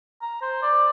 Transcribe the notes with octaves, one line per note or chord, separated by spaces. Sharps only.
A#5
C5
D5